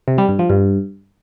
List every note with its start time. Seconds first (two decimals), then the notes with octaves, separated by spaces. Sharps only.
0.08 C3
0.18 G3
0.29 G2
0.39 F3
0.50 G2